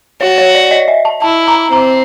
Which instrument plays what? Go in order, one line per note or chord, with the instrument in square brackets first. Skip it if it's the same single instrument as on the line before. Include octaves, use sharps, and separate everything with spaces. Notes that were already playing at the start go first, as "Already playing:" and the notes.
[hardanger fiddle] F#4 [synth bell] C#5
[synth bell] C#5
D5
D#5
E5
A5
[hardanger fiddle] E4 [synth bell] A5
[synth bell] A#5
[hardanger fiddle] C4 [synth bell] A#5